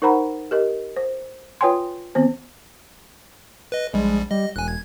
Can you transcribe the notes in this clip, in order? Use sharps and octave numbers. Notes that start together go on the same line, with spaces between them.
D#4 A#4 C5 F#5 A#5 B5
G4 A#4 D#5
C5
F4 B4 C#5 G5 G#5 C6
D#3 B3 C4 C5
B4 D#5
A#1 G3 G#3
G3 D#5
E1 G#5 F#6
G#6